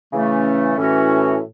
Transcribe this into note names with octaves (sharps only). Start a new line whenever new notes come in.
C#3 E3 A3 C#4
A2 E3 C#4 F#4